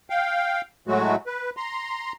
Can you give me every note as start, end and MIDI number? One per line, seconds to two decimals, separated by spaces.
0.10 0.61 77
0.10 0.61 79
0.88 1.15 45
0.88 1.15 54
0.88 1.15 56
0.88 1.15 57
0.88 1.15 66
1.27 1.50 71
1.57 2.13 82
1.57 2.13 84